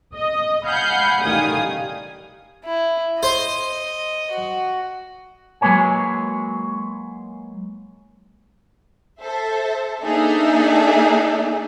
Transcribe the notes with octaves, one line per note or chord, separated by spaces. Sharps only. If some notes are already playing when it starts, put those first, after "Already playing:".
D#5 D#6
F5 F#5 G#5 B5 G6 C7
A1 D#3 G3 F5 G#5 D#6
E4
C5 D#5 C6
F#4
F#3 G#3 A#3 B4 C#5 G#5
A4 C5 E5
A#3 D4 D#4 G#4 A4 E5